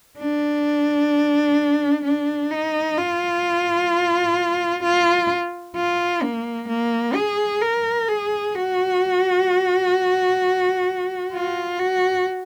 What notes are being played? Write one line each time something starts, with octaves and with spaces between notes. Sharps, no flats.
D4
D4
D#4
F4
F4
F4
A#3
A#3
G#4
A#4
G#4
F#4
F4
F#4